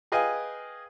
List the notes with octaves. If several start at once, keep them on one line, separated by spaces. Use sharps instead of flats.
G#4 B4 D#5 F5 G5 G#5